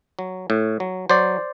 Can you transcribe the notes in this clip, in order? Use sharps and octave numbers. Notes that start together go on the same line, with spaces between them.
F#3
A2
F#3
F#3 C5 D5